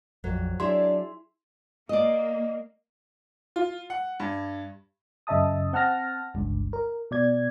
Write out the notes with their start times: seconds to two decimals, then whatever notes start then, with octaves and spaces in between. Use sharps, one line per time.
0.24 A#1 F2 F#3
0.60 F#3 D4 E4 G#4 D5 E5 C6
1.89 A#3 D5 D#5
3.56 F4
3.90 F#5
4.20 G2
5.27 F#2 C#3 D#5 E5 A5 D#6
5.73 C4 F#5 A5 F6 A#6
6.34 G1 C#2 G2
6.73 A#4
7.11 B2 D5 G#6